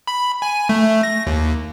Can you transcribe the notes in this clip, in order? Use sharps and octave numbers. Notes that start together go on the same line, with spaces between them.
B5
G#5
A3
A#6
D#2